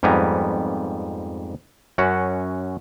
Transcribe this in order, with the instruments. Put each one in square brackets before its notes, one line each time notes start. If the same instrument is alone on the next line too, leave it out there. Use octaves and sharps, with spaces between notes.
[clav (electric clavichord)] F2 G#2 G3 B3 G#5 A#5
F#2 C#4 F#4 F#5